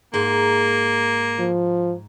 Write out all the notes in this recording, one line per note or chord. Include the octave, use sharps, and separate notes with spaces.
G#2 A#3
F3